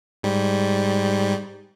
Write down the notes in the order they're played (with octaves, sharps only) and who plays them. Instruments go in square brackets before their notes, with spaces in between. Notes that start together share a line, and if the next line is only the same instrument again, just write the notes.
[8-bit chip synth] G#2 G3